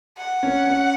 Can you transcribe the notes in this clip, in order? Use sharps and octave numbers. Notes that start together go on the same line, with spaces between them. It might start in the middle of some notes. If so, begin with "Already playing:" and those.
F#5
C#4
C#4